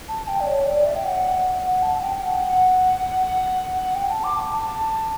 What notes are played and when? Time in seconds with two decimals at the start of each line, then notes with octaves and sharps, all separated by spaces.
0.08 A5
0.28 G5
0.40 D5
0.47 C#5
0.66 D5
0.86 E5
0.96 G5
1.05 F#5
1.63 F#5
1.83 A5
2.01 G5
2.21 F#5
3.95 G5
4.09 A5
4.24 D6
4.53 A5